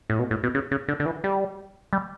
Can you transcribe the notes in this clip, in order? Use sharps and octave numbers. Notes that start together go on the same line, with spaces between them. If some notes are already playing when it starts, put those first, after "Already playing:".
A2
B2
A2
B2
C#3
C#3
D3
D3
E3
G3
G3